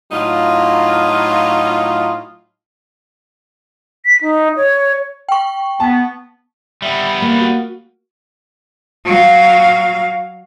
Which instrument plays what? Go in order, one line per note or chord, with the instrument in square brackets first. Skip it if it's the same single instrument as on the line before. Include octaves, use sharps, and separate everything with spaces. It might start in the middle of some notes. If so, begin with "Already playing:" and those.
[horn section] A2 F#3 D#4 F4
[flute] B6
D#4
C#5
[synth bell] G5 C#6
[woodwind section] B3 [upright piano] A5
[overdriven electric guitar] G3 B3 [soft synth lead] E5
[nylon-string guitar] A#3
[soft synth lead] F#4
[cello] F#3 F5